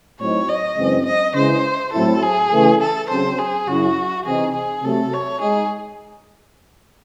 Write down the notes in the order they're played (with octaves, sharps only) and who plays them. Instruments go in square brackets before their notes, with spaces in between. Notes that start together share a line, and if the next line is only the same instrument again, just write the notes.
[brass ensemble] A2 F#3 C4 D#4 [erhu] C#5
[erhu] D#5
[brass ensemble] F#2 C#3 E3 G#3 C4
[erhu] D#5
[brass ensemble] C#3 E3 G#3 [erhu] C5
[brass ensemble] A2 F#3 C4 E4 [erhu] A4
[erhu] G#4
[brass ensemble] C#3 E3 A3
[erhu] A4
[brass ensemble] C#3 F#3 C4 [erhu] C5
[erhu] G#4
[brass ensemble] F#2 C#3 F#3 C#4 E4 [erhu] F#4
[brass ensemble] C3 E3 C4 D#4 [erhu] G#4
[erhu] G#4
[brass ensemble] C3 F#3 A3 [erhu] A4
[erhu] C#5
[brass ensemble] G#3 D#4 [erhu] G#4